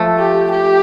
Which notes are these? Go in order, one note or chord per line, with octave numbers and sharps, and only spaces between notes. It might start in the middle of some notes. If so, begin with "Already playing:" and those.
Already playing: F3 A3
G4
G4